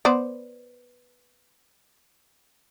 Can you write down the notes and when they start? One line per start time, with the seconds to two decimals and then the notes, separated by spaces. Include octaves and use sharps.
0.05 B3 C5 D5